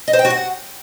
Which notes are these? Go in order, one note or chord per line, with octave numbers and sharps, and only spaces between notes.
D#5
C5
G5
F#4
F#5